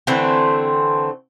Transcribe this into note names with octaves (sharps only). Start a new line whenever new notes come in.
D3 E3 A3 C4